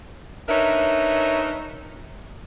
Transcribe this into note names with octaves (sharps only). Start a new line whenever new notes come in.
D4 D#4 A#4 B4 C#5 E5